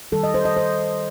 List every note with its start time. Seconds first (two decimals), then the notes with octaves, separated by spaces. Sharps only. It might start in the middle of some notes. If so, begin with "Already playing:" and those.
0.12 D#3 G3 A4
0.23 D#5
0.34 C5
0.45 D#5
0.57 C5